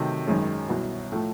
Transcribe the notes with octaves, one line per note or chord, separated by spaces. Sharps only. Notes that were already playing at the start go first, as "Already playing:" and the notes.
Already playing: C3 D#3 F#3 A3
G#1 F#2 D#3 G#3 C#4
C2 B2 F#3
A2 F3 A3